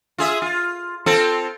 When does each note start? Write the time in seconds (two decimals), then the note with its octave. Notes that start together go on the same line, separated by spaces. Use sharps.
0.18 F4 G#4 E5
0.42 F4
1.06 C4 F4 A4